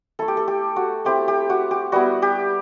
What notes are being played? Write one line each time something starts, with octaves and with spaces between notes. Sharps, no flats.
A3 E4 A4
G4
A4
G4
F#4
A3 C4 E4 G4
G4
F#4
G4
G3 B3 E4 F#4
G4